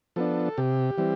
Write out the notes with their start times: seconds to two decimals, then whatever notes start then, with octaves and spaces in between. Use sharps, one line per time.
0.16 F3 B3 D4 A4
0.58 C3 G4
0.98 E3 G3 C4